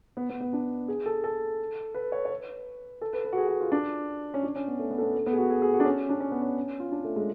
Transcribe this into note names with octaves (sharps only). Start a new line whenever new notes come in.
B3
B3
B3
D4
G#4
A4
A4
B4
C#5
C#5
B4
A4
B4
B4
F#4
G#4
F#4
F4
D4
C#4
D4
C#4
B3
A3
B3
A3
B3
A3
B3
G#4
F#4
G#4
G#4
F#4
D4
C#4
D4
C#4
B3
C#4
F4
D4
A3
G#3